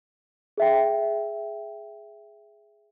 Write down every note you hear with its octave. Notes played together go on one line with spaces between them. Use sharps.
G#4 E5 G5